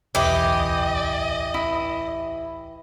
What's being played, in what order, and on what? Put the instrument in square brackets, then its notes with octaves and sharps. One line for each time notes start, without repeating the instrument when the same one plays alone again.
[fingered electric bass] D1 B1 E2 [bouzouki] E3 G4 [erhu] D#5 [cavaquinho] D6 D#6
[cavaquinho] E4